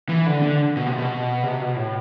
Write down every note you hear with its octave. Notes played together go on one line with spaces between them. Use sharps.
E3
D3
D3
B2
C3
B2
C3
B2
A2